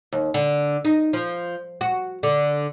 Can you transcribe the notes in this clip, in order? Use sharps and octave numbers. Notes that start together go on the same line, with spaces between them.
D#2
D3
D#4
F3
F#4
D3